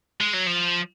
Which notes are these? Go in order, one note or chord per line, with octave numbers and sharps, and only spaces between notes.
G#3
F#3
F3